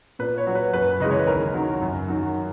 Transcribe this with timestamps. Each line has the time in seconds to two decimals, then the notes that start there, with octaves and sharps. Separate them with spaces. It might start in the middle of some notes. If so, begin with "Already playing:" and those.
0.19 A#2 B4
0.38 C#5
0.47 F#3
0.55 B4
0.73 F#2 B4
1.00 C#3 E3 G#3 D#5
1.11 C#5
1.19 B4
1.27 D#2 A#4
1.54 D#3 F#3
1.81 F#2
2.08 D#3 F#3